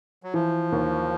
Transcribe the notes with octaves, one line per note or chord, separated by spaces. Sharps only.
F#3
E3 F3
D#2